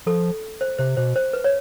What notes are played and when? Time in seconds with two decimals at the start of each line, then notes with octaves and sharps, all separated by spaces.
0.06 F3 A4
0.61 C5
0.79 C3 C5
0.97 B2 C5
1.16 C5
1.33 B4
1.44 C#5